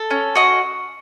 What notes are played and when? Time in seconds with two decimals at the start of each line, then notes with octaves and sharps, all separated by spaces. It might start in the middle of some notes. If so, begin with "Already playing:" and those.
Already playing: A4
0.11 C#4
0.35 F#4 D#5